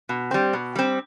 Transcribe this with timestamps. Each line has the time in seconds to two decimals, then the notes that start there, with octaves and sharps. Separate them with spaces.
0.09 B2
0.31 G3 C4
0.53 B2
0.76 G3 C4